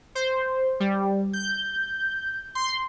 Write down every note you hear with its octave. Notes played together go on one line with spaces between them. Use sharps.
C5
G3
G6
C6